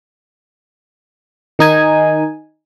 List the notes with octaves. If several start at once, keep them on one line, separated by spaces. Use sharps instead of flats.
D#3 D#4 G#5